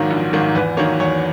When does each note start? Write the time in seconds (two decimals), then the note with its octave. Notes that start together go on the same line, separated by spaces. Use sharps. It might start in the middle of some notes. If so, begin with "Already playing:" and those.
Already playing: A#1 G#2 D#3 F#3 A#3
0.11 A#1
0.33 G#2 D#3 F#3 A#3
0.55 E2 B4
0.77 D#3 F#3 A#3 C#5
1.00 E2 C#5